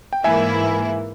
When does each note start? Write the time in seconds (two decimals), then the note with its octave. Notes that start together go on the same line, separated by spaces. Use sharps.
0.13 G5
0.24 G#2 E3 A#3 E4 E5 G#5